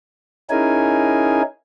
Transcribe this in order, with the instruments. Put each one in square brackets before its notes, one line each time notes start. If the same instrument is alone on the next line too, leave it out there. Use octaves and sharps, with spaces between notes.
[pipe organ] C#4 D#4 E4 G#4 A#4 G#5